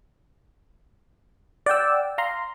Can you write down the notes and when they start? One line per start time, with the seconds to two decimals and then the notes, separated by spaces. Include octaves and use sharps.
1.66 D5 F#5 G5 E6
2.18 F5 A#5 C6